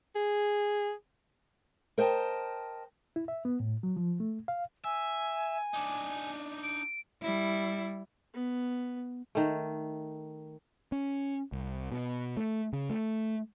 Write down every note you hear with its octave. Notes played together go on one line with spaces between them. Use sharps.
G#4
A#4 C5 D#5 G5 A5
E4
E5
B3
A2
F#3
F3
A3
F5
E5 G#5
D4 D#4
D7
G3 E4
B3
D#3 A3
C#4
C2
B2
A3
C#3
A3